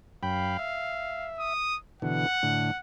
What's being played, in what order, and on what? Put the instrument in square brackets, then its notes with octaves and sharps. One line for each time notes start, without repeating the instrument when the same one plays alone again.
[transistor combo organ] F#2 G5 B5 [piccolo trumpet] F5
[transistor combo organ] E5
[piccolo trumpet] D#6
[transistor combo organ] B2 D3 E3 [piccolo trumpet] F#5
[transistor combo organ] A2 D3